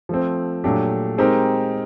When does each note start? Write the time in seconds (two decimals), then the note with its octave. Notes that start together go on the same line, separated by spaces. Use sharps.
0.09 F3 A3 C4
0.64 A#2 F#3 A3 D4 G4
1.18 G#3 C4 D#4 G4 A#4